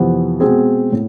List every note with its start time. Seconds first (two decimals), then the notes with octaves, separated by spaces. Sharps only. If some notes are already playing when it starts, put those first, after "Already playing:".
Already playing: F2 C3 E3 B3
0.40 B2 G#3 C4 G#4
0.92 A2